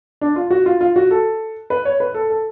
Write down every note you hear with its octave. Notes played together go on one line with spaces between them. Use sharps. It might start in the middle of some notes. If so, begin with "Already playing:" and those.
D4
F4
F#4
F4
F4
F#4
A4
B4
C#5
B4
A4
A4